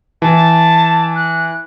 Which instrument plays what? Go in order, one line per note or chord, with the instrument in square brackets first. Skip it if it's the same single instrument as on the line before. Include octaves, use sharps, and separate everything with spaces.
[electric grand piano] E3 [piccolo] A5
[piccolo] F#6